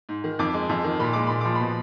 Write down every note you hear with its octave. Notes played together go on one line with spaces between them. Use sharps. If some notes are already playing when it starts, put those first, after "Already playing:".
G#2
D#3
F2 D6
G#3
F2
D#3
A#2 B5
G#3 D6
A#2 B5
F3 D6
B5
B2